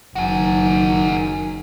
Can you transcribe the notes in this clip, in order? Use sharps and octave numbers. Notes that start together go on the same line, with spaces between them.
F#1 D#3 F#4 G#4